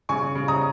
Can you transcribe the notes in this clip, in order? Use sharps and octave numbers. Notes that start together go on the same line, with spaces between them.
C#3 G#5 C#6
C#3
A#5 D#6